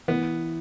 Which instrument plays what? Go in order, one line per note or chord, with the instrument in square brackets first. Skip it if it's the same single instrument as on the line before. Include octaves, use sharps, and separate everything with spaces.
[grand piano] E3 [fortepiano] B3